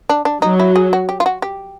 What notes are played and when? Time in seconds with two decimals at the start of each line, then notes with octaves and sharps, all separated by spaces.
0.09 D4
0.25 D4
0.42 F#3 D#4
0.60 E4
0.76 G#4
0.93 F#4
1.09 G4
1.20 F4
1.26 F#4
1.42 G4